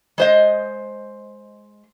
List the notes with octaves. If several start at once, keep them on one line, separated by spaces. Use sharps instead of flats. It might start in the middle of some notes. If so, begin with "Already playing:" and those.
G#3 C5 D#5